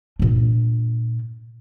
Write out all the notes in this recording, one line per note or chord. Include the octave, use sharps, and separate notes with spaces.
A#2 D4